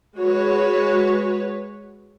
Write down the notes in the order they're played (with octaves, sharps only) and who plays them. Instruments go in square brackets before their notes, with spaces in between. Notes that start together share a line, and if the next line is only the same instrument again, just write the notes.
[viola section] G#3 F#4 B4 C#5